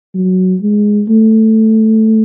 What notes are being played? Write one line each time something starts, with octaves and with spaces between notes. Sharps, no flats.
F#3
G#3
A3